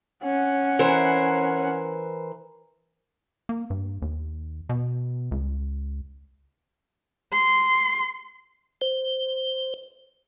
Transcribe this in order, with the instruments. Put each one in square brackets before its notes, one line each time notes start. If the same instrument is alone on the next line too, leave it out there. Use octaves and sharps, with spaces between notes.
[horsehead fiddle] C#4 F#5
[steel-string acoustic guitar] E3 A#4 C5
[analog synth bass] A#3
G2
D#2
B2
C#2
[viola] C6
[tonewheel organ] C5